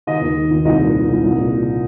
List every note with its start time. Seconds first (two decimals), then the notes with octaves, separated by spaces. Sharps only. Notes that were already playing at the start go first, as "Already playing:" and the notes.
0.07 D#3 D#4 D#5
0.21 D#2
0.36 D#3
0.51 D#2
0.65 C2 D#4 D#5
0.80 A#2
0.94 A#2
1.08 C2
1.23 C2
1.38 A#2
1.52 A#2